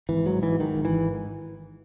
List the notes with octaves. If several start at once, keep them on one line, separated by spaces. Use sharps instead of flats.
G#1 E3
G#2 F#3
G#2 E3
G#1 D#3
G#1
E3
G#2